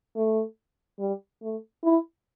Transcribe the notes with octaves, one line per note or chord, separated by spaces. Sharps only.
A3
G3
A3
E4